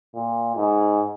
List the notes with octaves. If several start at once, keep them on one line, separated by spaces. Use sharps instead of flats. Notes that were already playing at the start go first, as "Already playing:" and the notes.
A#2
G#2